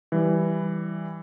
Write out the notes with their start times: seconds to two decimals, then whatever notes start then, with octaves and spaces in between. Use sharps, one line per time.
0.12 E3 G3